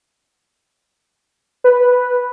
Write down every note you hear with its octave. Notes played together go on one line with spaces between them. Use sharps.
B4